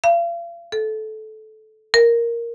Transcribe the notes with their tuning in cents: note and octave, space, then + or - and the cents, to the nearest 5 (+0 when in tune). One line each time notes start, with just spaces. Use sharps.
F5 -40
A4 -20
A#4 +0